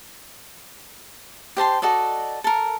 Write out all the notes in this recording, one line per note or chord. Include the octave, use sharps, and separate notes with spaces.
G4 C5 A5 C6
F#4 A4 D5 D#5
A4 A#4